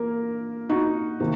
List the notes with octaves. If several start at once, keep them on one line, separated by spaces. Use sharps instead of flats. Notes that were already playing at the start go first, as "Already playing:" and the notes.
Already playing: A#3 A#4
D#4 F#4
C3 D#3 A#3